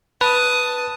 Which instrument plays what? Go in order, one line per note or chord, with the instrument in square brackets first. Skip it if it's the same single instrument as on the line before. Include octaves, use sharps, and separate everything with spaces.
[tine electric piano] B4 [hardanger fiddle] A5 D#6